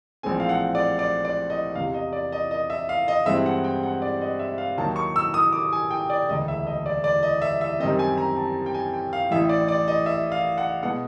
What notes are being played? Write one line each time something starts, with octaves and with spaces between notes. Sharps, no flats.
A#1 A2 E3 G#3 C4 G#5
F5
F#5
D5
D5
D5
D#5
E2 C3 E3 F5
D#5
D5
D#5
D#5
E5
F5
D#5
G2 E3 G#3 C4 E5
F#5
G5
F#5
D5
D#5
E5
F5
D#2 D#3 F#3 A5
C#6
E6
D#6
D6
G#5
G5
D5
E1 D2 C#3 D#5
E5
D#5
D5
D5
D#5
E5
E5
F#2 D#3 G3 C4 D#5
G#5
A#5
A5
G5
G#5
G5
F5
A1 A2 E3 E5
D5
D5
D#5
E5
F5
F#5
B2 G#3 B3 F#5